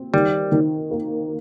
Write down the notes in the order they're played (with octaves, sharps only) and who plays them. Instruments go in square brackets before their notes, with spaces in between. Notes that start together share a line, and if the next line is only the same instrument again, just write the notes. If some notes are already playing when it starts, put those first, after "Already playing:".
Already playing: [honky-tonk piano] C4
[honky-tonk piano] D#3 [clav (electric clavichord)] G3
[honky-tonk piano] D#3
A#3